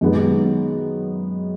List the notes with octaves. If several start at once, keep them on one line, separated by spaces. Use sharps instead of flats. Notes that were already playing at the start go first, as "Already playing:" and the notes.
F#2 D#3 G#3 B3